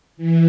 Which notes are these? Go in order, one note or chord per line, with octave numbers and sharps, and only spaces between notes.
E3